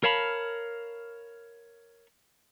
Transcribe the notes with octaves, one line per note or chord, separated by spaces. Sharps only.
A#4 C#5 F5 A5 B5